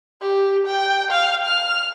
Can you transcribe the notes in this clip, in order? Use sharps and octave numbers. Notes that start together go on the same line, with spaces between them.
G4
G5
F5
F6